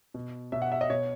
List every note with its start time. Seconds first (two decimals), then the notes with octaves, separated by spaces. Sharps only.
0.14 B2
0.52 B2 E5
0.62 F#5
0.72 E5
0.81 D#5
0.90 B2 C#5